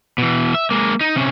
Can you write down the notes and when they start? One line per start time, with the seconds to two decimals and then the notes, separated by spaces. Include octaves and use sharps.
0.18 B2 E3
0.54 E5
0.71 G#3 A#3
1.01 D#4
1.16 C3 C#4